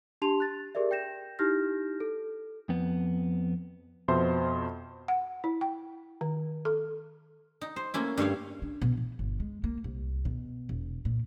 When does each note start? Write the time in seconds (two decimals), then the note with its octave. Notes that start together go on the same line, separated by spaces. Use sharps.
0.22 D4 G4 A5 C6 F7
0.40 F#6 A6
0.75 G4 G#4 A#4 D5 E5
0.91 G5 G6 A#6 E7
1.39 D#4 E4 G4 F6 G6 A#6
2.00 A4
2.69 F2 B3
4.08 F2 B2 C5 E5 C6
5.08 F#5
5.44 E4
5.61 G5
6.21 D#3
6.65 A4
7.61 D#4
7.76 C5
7.94 A3 A#3 C#4 E4
8.17 G2 A3 C#5 F5
8.62 D4
8.82 B2
8.97 E3
9.19 G1
9.40 G#3
9.64 A#3
9.84 C2
10.25 B2
10.69 E1
11.05 A#2